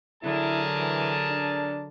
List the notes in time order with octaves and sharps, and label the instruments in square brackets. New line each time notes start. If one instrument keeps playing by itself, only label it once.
[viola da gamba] D3 F#3 [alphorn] E4 [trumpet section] G#4 A#4 A5
[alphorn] E3
D4